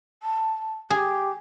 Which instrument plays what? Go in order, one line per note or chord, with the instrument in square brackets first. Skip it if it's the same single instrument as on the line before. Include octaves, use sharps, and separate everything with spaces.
[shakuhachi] A5
[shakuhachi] G4 [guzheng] G#4